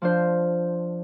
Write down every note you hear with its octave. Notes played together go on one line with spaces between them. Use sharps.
F3 D4 C5